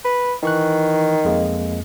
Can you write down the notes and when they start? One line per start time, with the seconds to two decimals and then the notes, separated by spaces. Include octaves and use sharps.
0.05 B4
0.43 D#3 E3 C#6 F#6
1.25 F2 G#3 A#3